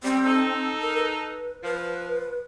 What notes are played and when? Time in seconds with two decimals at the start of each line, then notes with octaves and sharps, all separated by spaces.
0.03 G3 C4
0.25 D#4 A4
0.81 A#4
0.96 B4
1.63 F3 B4